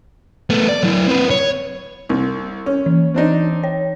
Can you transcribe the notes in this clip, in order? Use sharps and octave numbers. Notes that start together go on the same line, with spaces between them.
A3 B3
D5
F#3 E4
C4 B4
C#5
C2
C#4
E3
C4 D4 D#4
C#5